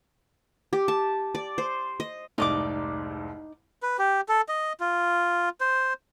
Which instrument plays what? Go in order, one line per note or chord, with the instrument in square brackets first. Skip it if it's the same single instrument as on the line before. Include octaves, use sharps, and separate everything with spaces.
[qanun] G4
A5
D5
C5
D#5
[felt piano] F1 C2 G#2 [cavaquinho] D#4 D5 D6
[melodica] B4
G4
A4
D#5
F4
C5